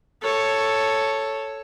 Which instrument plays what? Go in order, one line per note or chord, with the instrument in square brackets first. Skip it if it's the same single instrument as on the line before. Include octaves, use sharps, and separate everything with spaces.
[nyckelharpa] A4 C#5